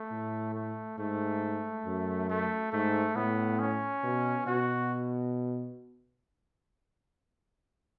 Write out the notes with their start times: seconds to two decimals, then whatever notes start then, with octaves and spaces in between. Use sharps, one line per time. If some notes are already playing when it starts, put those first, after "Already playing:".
Already playing: A3
0.12 A2
0.54 A3
0.98 G#2 A3
1.86 F#2
2.30 A3
2.72 G#2 A3
3.16 A2 B3
3.59 C#4
4.04 B2
4.47 B2 F#4